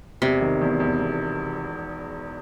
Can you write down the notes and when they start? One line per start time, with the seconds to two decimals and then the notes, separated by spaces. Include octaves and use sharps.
0.22 E1 C3
0.41 D#3
0.61 E2
0.80 E2
0.99 E1